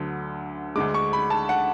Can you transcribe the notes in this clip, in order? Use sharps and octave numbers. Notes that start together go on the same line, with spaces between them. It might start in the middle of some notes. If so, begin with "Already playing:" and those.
Already playing: D2 D3 F#3
D2 D3 G#3 D6
C#6
B5
A5
F#5